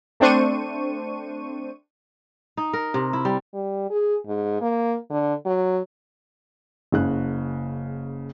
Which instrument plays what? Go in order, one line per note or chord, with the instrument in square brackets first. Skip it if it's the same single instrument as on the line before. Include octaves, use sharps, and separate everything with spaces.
[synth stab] A3 C4 D4 C5 C#6 D#7
[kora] D#4
A#4
C3
E4
G3
[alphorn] G3
G#4
G#2
A#3
D3
F#3
[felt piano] F#1 C#3 F#6